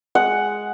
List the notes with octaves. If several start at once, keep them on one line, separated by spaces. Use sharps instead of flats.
G#3 F#5